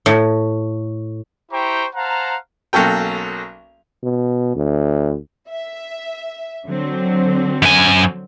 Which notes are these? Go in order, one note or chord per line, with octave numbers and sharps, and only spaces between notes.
A2
E4 G4 C5 G5 A#5 C#6
C5 F5 F#5 A5 A#5
B1 F#3 A#3 C#4 A4 G5
B2
D2
E5
D3 F#3 C4
F#2 G#5